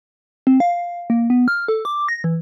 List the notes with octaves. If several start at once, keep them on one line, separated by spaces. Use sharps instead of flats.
C4
F5
A#3
B3
F6
A4
D6
A#6
E3